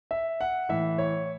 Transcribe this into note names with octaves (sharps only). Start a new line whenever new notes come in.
E5
F#5
A2 E3 E5
C#5